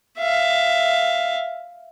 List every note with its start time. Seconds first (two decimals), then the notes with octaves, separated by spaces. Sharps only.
0.19 E5 F5